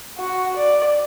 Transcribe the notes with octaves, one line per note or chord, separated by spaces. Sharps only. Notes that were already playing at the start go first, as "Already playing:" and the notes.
F#4
D5